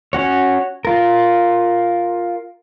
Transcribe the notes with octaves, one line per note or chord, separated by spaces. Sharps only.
C#4 F#4 C#5
F4 A#4